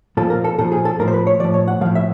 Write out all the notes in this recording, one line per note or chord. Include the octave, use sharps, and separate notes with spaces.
A#2 F3 A4
A#4
A4
A#2 F3 A4
G#4
A4
A2 F3 A#4
C5
B4
C#5
A2 F3 D5
C#5
F#5
A2 F3 F5
E5